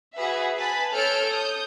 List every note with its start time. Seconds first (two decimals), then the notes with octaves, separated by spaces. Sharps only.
0.16 F#4 G#4 B4 E5
0.57 B4 G#5 A5 B5
0.94 A4 C#5 E6 F6 G6 D7
1.29 D#6 G6